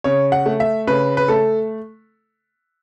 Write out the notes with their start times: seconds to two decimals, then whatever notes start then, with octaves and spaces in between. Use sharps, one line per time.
0.04 C#3 C#5
0.32 F#5
0.46 A3
0.60 E5
0.87 C#3 B4
1.17 B4
1.28 A3 A4